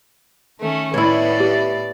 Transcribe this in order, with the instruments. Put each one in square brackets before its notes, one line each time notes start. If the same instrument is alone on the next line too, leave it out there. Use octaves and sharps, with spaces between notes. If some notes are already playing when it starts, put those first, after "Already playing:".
[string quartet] D#3 A3 C#4
[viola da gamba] A2 D5 [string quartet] B3 [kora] E4 C#5
[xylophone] G4